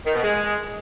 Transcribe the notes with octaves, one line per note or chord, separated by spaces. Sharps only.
D#3
B2
G#3